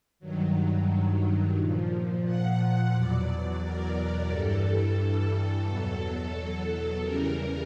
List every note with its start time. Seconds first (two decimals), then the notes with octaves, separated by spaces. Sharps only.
0.19 G2 D#3 F#3
1.56 A#2 F3
2.24 F#5
2.58 F#5
2.93 E2 B2 F#3 D5
3.61 A#4
4.29 G2 E3 G3 A4
5.65 E2 B2 F#3 A4
7.02 E2 C#3 E3 G3 A#4